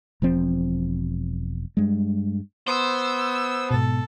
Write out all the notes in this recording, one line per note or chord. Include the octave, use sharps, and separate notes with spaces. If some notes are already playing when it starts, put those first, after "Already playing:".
E1 F3 C4
G2 G#3
B3 C5 E6
G#2 B2 A4